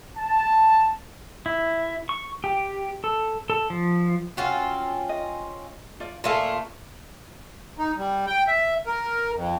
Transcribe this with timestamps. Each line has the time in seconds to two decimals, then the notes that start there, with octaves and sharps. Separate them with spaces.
0.16 A5
1.46 E4
2.09 C#6
2.44 G4
3.04 A4
3.50 A4
3.70 F3
4.37 C4 C#4 F4 F#4
5.09 D#5
6.00 F4 D5
6.24 A#2 A3 A#3 A4 F5 G#5
7.79 D#4
7.97 G3
8.27 G5
8.48 E5
8.87 A#4
9.34 F2